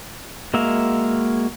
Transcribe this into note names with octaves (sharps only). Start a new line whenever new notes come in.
G#3 A#3 F#4 E5 F5